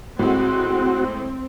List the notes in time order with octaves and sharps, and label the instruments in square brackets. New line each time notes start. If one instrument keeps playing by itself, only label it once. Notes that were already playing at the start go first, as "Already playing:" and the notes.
[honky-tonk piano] A2 G#3 [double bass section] C4 [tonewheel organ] F#4